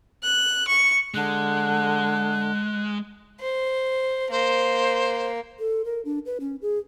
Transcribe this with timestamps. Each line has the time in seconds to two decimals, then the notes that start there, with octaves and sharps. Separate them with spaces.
0.23 F#6
0.68 C#6
1.14 D3 G#3 F#6
3.41 C5
4.31 A#3 C5
5.59 A4
5.85 A#4
6.05 D4
6.26 B4
6.40 C#4
6.62 G#4